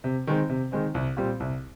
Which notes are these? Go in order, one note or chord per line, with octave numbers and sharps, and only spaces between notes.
C3
D#3 G#3 C4
C3
D#3 G#3 C4
C2
A#2 G3 C4
C2